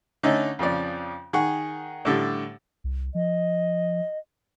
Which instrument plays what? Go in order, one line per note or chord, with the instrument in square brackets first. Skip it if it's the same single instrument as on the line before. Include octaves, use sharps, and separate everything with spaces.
[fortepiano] D3 A3 C#4 D#4
F2 C#3 F3 D5
D#3 G#4 F#5 C#6
A2 D3 G3
[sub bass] C2
[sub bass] F3 [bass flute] D#5